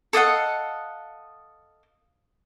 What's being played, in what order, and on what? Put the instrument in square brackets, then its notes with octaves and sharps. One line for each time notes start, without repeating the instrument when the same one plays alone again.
[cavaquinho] A4 D#5 F5 F#5